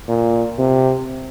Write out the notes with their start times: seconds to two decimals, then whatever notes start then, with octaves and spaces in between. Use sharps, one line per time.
0.08 A#2
0.58 C3